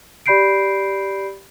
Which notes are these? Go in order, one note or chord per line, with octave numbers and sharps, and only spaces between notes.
G4 D5 B5 G6 C7 D7